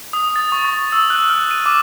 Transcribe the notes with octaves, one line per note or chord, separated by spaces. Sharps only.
D#6
A6
C#6
A6
E6
F#6
F6
D#7
D6